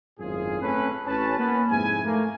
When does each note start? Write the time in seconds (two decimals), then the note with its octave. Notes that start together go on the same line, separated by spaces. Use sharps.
0.20 G#1 F#2 A2 F4 G#4
0.62 A3 C4 C#4 A4 B4
1.06 A1 C#4 B4 A5
1.38 A#3 B3 C#4 B4
1.70 F2 G#2 C3 E4 G#5
2.05 A3 A#3